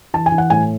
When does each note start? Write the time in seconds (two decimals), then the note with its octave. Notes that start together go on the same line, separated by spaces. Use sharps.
0.14 E3 A5
0.26 G#5
0.32 E3
0.38 F#5
0.50 A2 G#5